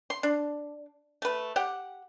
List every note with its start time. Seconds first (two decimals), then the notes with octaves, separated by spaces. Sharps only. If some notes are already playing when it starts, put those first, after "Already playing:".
0.10 C6
0.23 D4
1.22 A3 B4
1.56 G4 F#5